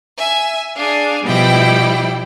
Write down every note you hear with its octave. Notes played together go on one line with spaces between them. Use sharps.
E5 G#5
D4 G#4 F5
B2 F3 G3 E4 G5